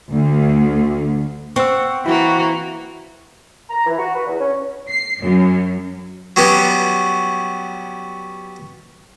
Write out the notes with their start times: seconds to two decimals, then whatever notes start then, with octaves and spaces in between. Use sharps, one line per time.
0.11 D2
1.56 C4 F#5 C#6 E6
2.06 E3 A#3 E4 F#4
3.70 A#5
3.86 E3
3.98 F#4
4.15 B4
4.27 E2
4.39 C#4
4.89 C7
5.20 F#2
6.36 F#3 G3 B3 C#4 F#4